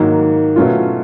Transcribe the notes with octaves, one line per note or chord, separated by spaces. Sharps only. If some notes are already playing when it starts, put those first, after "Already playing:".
Already playing: G#2 D#3 F#3 A#3
B2 F#3 A3 C#4 F4